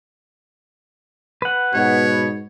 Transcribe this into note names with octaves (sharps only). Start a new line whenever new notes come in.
B4 F#5
G#2 B2 C#5